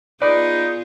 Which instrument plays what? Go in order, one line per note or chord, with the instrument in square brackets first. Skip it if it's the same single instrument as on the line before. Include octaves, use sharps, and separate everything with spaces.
[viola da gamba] B3 F4 G#4 [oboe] D#4 [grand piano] B4 [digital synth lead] D5